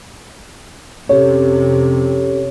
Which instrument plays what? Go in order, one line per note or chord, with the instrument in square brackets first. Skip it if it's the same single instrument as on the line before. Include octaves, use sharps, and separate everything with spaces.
[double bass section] F2 C3 [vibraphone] C#4 G4 A4 [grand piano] C#5